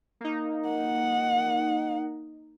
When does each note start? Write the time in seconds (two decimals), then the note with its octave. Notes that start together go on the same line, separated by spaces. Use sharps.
0.21 A#3 D#4
0.69 F#5